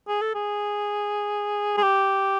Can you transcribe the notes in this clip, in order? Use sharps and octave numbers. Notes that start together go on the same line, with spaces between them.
G#4
A4
G#4
G#4
G4